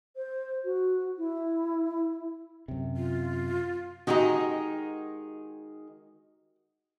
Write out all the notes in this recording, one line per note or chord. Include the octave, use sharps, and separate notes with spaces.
C5
F#4
E4
F#2 C3
F4
D#3 G#3 D#4 F#4 G4